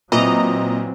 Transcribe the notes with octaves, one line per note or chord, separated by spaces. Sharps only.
A#2 E3 F#3 C4 D#5 A#5